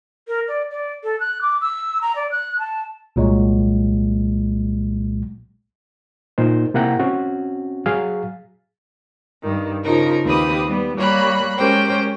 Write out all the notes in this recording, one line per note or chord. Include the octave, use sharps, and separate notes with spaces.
A#4
D5
D5
A4
F#6
D6
E6
A#5
D5
F#6
A5
C2 A#2 F#3 G#3
A#2 D#4 C5
C3 A#3 E4 F#5 G5 A#5
C4 C#4 F#4
F#3 G#4 F5
G2 D#3
C#3 F3 D#4 A#4
D#2 C4 G4 B4 D#6
G3 B3
G3 A#3 C#5 B5 F#6
G#3 C#4 G4 A#4 C5 G5